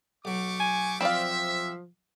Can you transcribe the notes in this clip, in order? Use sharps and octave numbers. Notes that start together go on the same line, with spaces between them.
B1 F#3 A3 C#6 D6
G#5
F3 C4 D5 E5 F5